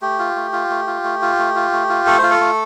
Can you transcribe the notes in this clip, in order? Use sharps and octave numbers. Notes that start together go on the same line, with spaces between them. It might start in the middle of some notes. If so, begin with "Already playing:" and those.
A3 G4
F4
A3
F4
A3
F4
A3
F4
A3
F4
A3
F4
A3 A4
F4 C5
A4
A3